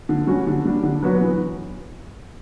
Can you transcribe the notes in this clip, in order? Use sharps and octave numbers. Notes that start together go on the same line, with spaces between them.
D3
G3 C#4 F#4
D3
G3 D4
D3
F#3 B3 F#4 B4
E3